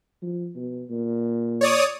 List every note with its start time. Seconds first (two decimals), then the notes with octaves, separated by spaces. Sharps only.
0.22 F3
0.55 B2
0.90 A#2
1.61 C#5 D5 D#6